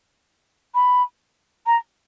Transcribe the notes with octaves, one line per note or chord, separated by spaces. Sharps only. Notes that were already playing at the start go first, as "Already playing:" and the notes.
B5
A#5